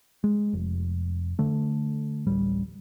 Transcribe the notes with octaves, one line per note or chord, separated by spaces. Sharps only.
G#3
F1
D3 A3
D1 A1 G3